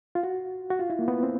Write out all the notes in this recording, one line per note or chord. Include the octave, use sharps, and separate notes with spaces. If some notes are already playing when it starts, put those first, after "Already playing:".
F4
F#4
F#4
F4
E4
A#3
B3
C4